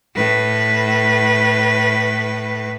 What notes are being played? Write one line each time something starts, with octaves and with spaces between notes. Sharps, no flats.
A2 B4